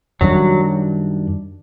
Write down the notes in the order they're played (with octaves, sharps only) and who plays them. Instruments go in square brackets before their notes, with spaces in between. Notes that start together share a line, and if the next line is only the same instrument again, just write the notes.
[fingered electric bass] F#2 D#3 G3 D4 [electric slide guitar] F#3